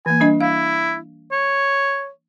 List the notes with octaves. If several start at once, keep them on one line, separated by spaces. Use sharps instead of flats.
E3 A#3 G#5
G3 D4 D#5
E4 F5
C#5